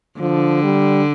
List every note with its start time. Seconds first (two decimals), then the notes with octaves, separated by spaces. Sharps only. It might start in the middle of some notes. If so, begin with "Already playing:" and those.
0.20 D3 F3
0.63 G3